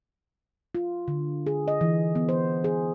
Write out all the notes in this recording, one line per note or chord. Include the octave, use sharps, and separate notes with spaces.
F4
D3
G#4
D#5
E3
B3
C5
G#4